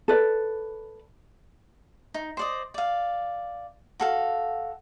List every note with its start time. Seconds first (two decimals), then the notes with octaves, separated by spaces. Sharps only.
0.08 A4 B4 D5
2.14 D#4
2.37 C5 D5 D#5
2.74 D5 F5
4.00 F#4 A4 F5